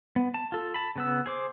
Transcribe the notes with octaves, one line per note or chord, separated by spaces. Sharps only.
B3
A5
F4 A4
A5 B5
C#3 B3 E6
G#4 C5 D6